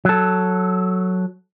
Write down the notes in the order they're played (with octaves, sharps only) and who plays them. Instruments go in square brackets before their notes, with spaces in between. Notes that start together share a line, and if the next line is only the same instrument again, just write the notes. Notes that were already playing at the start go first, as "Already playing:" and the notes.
[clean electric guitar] F#3 A4